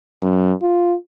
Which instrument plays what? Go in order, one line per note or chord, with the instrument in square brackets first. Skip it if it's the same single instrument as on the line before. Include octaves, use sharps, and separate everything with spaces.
[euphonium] F#2
F4